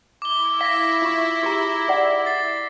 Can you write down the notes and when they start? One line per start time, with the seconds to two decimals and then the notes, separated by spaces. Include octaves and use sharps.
0.22 E4 D6 G7
0.61 F5 D6 A#6 B6
1.02 F4 C#6
1.43 G4 G#4 A#5
1.88 G#4 D5 F#5
2.26 A6 C7